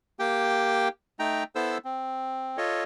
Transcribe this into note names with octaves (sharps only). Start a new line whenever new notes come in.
A#3 G4 G5
A3 D#4 G5 A#5
B3 E4 A4 C5 E6
C4
F4 A4 C#5 D#5